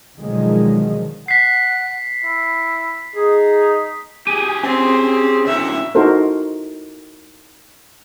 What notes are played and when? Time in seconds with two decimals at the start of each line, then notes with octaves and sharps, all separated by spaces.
0.21 B2 D3 D#3 F3 F#3 G#3
1.28 F#5 B6 C7
2.24 E4
3.16 D#4 G#4
4.27 G4 G#4 G#5
4.63 C4 C#4
5.47 D2 A2 E5
5.95 D#4 E4 F#4 A4 A#4 C5